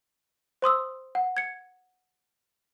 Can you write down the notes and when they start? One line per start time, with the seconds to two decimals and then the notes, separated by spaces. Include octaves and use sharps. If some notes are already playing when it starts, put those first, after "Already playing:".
0.62 C5 C6 D#6 E6
1.15 F#5
1.37 G#6 C#7